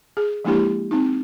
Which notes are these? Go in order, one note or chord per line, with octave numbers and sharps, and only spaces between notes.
G#4
F3 G#3 A#3 D4 E4 G4
C4 D#4